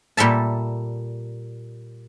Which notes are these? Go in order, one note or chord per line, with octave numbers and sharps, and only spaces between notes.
A#2 G3 A4 E5 A5